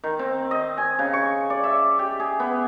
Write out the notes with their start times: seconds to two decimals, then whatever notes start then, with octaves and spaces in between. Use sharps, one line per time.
0.04 D#3
0.19 C4
0.51 D#5
0.77 G#5
0.99 C#3
1.13 C#6
1.50 D5
1.64 E5
1.99 G4
2.20 G#4
2.40 B3